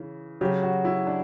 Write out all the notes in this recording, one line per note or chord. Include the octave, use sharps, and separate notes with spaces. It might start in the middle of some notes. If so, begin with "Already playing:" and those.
Already playing: C#3 E3
C#3 F#3 G4
F#4
E4
D4